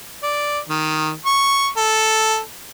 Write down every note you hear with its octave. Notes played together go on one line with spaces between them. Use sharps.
D5
D#3
C#6
A4